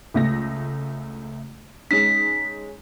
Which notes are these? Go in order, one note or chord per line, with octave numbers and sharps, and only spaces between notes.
C#2 A3 A#6
G#3 C#4 D#4 B6